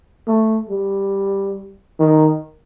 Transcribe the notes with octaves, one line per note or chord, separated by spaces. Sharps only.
A3
G3
D#3